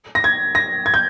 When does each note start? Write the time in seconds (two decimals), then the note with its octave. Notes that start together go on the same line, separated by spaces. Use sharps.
0.15 A#6
0.24 G#6
0.55 A#6
0.86 G#6
0.94 G6